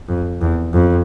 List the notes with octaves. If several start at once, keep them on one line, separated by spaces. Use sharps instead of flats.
F2
E2
F2